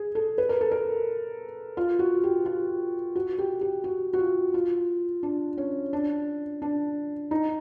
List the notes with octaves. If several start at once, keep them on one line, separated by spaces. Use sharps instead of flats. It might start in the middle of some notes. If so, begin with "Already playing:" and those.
Already playing: G#4
A4
B4
A#4
A4
A#4
F4
F#4
G4
F4
F#4
G4
G4
F#4
F#4
F4
F4
D4
C#4
D4
D4
D#4